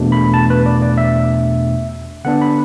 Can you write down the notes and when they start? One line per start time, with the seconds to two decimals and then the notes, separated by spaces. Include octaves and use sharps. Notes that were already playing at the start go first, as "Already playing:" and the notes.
Already playing: E2 B2 A3 D4
0.12 B5
0.34 A5
0.50 B4
0.66 D5
0.82 D5
0.98 E5
2.25 D3 B3 D4 F#5
2.41 B5